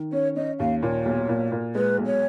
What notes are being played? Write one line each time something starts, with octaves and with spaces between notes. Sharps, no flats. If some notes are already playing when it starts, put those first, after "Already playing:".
Already playing: D#3
C#4 C#5
C#4 D#5
D#2 F5
A#2 C#5
B1
A#2
A#2
G#3 B4
B1
C#5